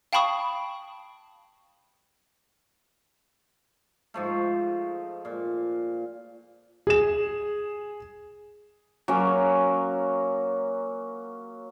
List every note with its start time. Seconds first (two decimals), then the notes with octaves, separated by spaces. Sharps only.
0.13 F5 G5 A5 B5 C#6 D#6
4.14 G#2 F3 A3
5.25 A#2
6.87 G#4 E7
9.08 F#3 A#3 C#4 A#4